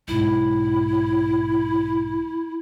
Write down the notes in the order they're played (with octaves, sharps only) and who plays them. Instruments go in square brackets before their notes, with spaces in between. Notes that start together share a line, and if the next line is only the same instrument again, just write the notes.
[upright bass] B1 G#2 [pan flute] E4